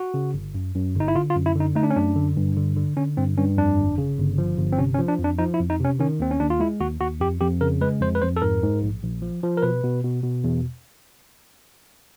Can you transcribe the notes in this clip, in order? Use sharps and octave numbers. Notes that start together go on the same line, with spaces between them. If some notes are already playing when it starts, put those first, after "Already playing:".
Already playing: F#4
C#3
G1
F#2
F#2
G1
D#4
E4
D3 F4
F4
F#2
E4
D3 D#4
A3 D#4
D4
C#4
F#2 D4
D3
G2
D3
D3
D3 C#4
G2 C4
G2 C#4
F2 D4
G1
C#3
G1
F3
G1
C4
C3 C#4
C#4
F3
D4
F2
D4
F3 D#4
E4
F2
D#4
C3 C#4
D#3 C#4
D#2 C4
C#4
D#2 D4
F4
G#3 E4
D#2 F#4
D#2 F#4
F2 G4
F2 G4
C#3 A#4
G#3 B4
F2 C5
B4
F2 C5
A4
G#2 A#4
G#2
A#1
A#1
F3
F3
A#4
B2 B4
B2
B2
B2
E2